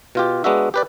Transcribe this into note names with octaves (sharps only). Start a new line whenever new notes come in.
B2 F4 G4
G#3 B3 D4 F#4 E5
G4 B4 D5